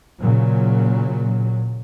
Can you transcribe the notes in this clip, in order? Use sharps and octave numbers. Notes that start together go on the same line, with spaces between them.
A#2 C#3 F#3